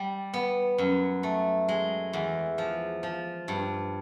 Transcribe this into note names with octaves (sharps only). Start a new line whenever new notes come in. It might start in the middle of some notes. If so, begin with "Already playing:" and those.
Already playing: G3
B3
F#2
A3
G#3
E2
F3
F3
G2